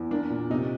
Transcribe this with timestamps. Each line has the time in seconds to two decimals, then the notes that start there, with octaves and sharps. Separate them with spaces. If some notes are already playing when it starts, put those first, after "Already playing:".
Already playing: E2
0.11 A#3 D4
0.30 A#2
0.50 C3 D#4